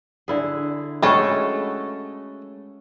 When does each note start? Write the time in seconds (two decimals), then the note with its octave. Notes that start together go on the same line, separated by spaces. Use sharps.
0.28 D3 E4 G#4
1.02 G#3 A3 C#4 F#4 A4 B5 C#6